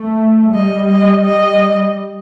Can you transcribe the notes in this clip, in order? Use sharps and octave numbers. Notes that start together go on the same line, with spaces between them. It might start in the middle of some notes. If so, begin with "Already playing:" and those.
Already playing: A3
G3 D#5
D#5
D#5